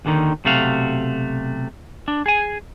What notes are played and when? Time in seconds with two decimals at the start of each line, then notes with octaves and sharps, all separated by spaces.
0.05 D#2 B2 D3 D#3
0.45 B1 C3 A3 F#4 F5
2.08 D4
2.26 G#4 G#5